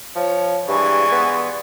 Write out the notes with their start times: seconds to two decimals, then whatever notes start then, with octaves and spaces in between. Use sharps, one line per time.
0.15 F3 C#5
0.68 G2 E3 G#3 D5 C#6
1.12 B3